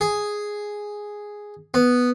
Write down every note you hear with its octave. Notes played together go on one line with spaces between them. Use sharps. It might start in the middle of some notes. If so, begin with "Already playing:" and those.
G#4
B3